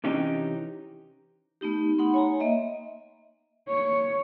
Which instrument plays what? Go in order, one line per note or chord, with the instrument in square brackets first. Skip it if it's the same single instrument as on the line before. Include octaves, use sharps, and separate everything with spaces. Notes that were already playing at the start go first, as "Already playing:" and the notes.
[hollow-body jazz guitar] C3 E3 C#4 D#4 G4
[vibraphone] A3 B3 D#4 G4
D#4 F#5 B5 C6
C#5 G#5 A#5
A#3 D#5 E5
[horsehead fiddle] C#5